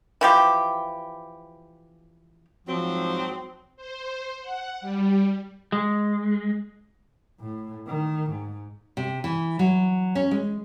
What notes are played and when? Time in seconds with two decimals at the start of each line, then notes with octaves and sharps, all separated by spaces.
0.21 E3 F3 G4
2.67 G#2 F3 F#3 C4
3.77 C5
4.41 F#5
4.81 G3
5.72 G#3
7.40 A2
7.87 D#3
8.30 G#2
8.97 C3
9.24 E3
9.59 F#3
10.15 C#4
10.31 G#3